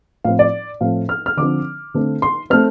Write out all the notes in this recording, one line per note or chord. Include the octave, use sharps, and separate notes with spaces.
A2 F3 C4 F5
D5
A2 F3 A3 C4 F5
F6
F6
D3 F3 C4 D6
D3 A3 C4
C6
A3 C4 F6